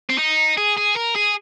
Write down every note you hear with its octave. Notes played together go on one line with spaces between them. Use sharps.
C4
D#4
G#4
G#4
A#4
G#4